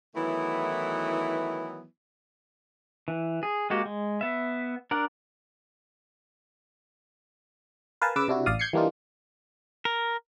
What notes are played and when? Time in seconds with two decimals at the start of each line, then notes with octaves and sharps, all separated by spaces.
0.15 D#3 E3 F#3 A3 B3 E4
3.08 E3
3.43 G#4
3.70 G#3 A#3 F#4 G4
3.85 G#3
4.21 B3 E5
4.91 D4 A#4 D5 F#5
8.02 A#4 B4 F5 G#5 A5
8.16 C#3 B4 D6 E6
8.28 C3 D4 E4 F#4
8.46 A1 D5 F5 D#6
8.59 G6 G#6 C7 C#7
8.73 E3 G3 A#3 D4 D#4 F4
9.85 A#4